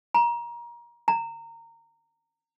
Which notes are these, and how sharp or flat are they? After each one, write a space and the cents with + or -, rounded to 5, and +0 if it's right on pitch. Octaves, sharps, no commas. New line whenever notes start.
A#5 +25
A#5 -20